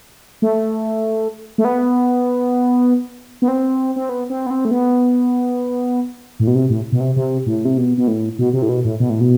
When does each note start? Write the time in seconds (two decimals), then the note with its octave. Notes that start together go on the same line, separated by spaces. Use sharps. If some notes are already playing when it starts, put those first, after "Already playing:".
0.42 A3
1.58 A3
1.65 B3
3.42 B3
3.48 C4
3.96 C4
4.09 B3
4.30 C4
4.46 B3
4.50 C4
4.65 A3
4.71 B3
6.40 A2
6.47 B2
6.55 C3
6.70 A2
6.92 B2
7.00 C3
7.16 C3
7.46 A2
7.65 C3
7.77 B2
7.98 B2
8.08 A2
8.39 B2
8.53 C3
8.62 A2
8.69 B2
8.85 A2
9.00 B2
9.10 A2
9.21 B2